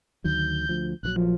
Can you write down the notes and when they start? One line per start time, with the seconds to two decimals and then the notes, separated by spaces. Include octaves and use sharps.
0.24 D2 D#3 F#3 G6
0.69 D2 F3
1.03 A#1 D#3 F#3 F#6
1.16 F3